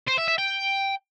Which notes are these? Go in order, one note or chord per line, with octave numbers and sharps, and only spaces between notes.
C5
E5
E5
G5